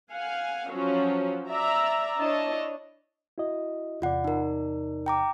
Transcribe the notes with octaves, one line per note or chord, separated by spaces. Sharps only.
F5 F#5 G#5
F3 F#3 C#4 F#4
D5 E5 A#5
D4 E4 C#5 D#5 A5
E4 F#4 D#5
E2 C3 F4 D5 F#5
D#4 A#4
G5 A#5 D6